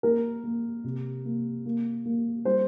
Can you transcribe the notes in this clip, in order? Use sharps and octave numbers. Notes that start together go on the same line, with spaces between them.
A#3 A#4
A#3
C3
A#3
A#3
A#3
G3 C5